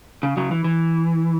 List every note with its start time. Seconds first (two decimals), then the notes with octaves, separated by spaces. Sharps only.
0.23 C#3
0.37 C#3 F#3
0.51 E3
0.64 E3